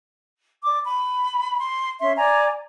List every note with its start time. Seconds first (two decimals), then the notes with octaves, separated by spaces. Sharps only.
0.64 D5 D6
0.85 B5
1.60 C6
2.00 C#4 E5 C6
2.17 D5 G#5 A#5